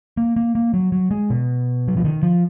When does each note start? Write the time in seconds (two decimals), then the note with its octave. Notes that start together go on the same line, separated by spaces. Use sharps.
0.17 A#3
0.36 A#3
0.55 A#3
0.74 F#3
0.92 F#3
1.11 G#3
1.30 B2
1.88 F#3
1.97 F3
2.05 D#3
2.23 F3